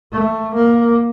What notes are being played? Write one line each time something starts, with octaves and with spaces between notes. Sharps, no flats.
A3
A#3